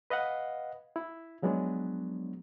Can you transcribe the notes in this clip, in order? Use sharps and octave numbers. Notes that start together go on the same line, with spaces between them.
B4 D#5 F5 F#5
E4
F3 F#3 G#3 B3 D4